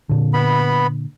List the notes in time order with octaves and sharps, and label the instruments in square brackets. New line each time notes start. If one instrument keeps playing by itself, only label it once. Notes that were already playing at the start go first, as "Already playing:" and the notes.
[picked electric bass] A#2 D3
[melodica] B3 B5